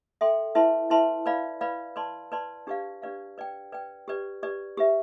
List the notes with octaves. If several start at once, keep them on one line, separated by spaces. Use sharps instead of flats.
A4 E5 G5 C6
E4 B4 E5 A5 C6
E4 B4 E5 A5 C6
B4 D5 F5 B5
B4 D5 F5 B5
B4 D5 A5 C6
B4 D5 A5 C6
D4 G4 B4 D5 F5
D4 G4 B4 D5 F5
B4 D5 G5
B4 D5 G5
G4 B4 D5
G4 B4 D5
G4 B4 E5